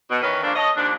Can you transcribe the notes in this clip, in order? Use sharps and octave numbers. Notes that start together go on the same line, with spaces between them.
B2
D#3 E3 C#4 B4
C#3 F3 A#3 C#4 D4
A4 C#5 D#5
D#2 F3 D4